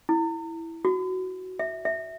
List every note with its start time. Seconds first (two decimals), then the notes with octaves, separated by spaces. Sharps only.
0.09 E4
0.85 F#4
1.59 E5
1.85 E5